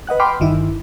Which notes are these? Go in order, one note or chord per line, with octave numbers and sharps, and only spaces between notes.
B4 D#5 F#5 F#6
G5 B5 C6 D6 D#6 F6
G1 D#3 E4